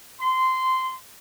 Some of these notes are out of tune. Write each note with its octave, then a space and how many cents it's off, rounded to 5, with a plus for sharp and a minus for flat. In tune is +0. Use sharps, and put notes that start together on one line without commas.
C6 -15